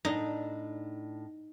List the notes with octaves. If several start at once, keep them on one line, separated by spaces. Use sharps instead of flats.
A2 D4 D#4